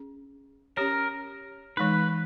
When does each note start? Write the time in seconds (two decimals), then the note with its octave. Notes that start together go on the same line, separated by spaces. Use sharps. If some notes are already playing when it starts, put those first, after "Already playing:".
Already playing: C#4 G#4
0.77 C#4 G4 A#4 C#5
1.77 E3 G#3 D#4 B4